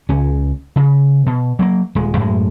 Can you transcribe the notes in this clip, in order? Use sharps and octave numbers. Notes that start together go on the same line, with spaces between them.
C#2 C#4
C#3
B2
F#3 A3 A#3
D#1 G#3
F#2 A2 G#3